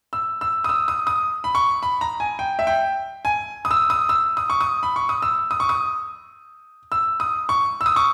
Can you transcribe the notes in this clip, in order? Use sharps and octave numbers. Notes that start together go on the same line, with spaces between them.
E6
E6
D#6
E6
D#6
D#6
B5
C#6
B5
A#5
G#5
G5
E5
G5
G#5
D#6
E6
D#6
E6
D#6
C#6
D#6
B5
C#6
D#6
E6
D#6
C#6
D#6
E6
D#6
C#6
E6
D#6
C#6